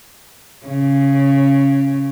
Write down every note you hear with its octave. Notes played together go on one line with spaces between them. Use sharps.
C#3